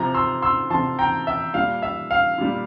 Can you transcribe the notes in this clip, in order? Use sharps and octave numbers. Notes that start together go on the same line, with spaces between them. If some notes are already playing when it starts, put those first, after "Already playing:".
Already playing: C3 F3 A#5
C6 E6
C6 E6
C3 F3 A5 C6
G5 A#5
E5
A#2 G3 F5
E5
F5
A#2 G3